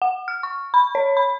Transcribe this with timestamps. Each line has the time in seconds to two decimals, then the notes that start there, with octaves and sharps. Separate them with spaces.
0.02 F#5
0.28 F6
0.43 C#6
0.74 B5
0.95 C#5
1.17 B5